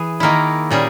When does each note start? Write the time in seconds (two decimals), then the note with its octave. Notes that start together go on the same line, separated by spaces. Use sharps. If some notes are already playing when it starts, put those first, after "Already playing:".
Already playing: E3 G#4
0.20 D#3 A#3 E4
0.71 A#2 G3 C#4 G#4